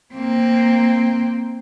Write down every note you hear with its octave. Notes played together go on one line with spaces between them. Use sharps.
A#3 C4